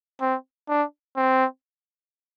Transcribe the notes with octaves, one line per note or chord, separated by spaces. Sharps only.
C4
D4
C4